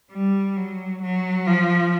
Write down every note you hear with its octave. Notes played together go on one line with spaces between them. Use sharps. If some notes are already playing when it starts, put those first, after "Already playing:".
G3
F#3
F#3
F3